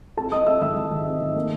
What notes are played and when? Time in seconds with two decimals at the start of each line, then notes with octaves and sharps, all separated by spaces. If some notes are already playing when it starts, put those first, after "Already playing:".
0.17 C4 A4 A5
0.32 C4 D#5 D#6
0.47 C4 E5 E6
0.61 D#3 E5 E6
0.76 D#3
0.91 D#3
1.06 C4
1.21 D#3
1.35 A#3